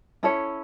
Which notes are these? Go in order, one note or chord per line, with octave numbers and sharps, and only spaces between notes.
C#4 E4 A4 C#5